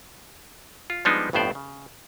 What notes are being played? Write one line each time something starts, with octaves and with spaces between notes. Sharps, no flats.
F4
F3 G3 G#3 B3 D4 D#4
G1 F2 A2 B3 C5 D5
C#3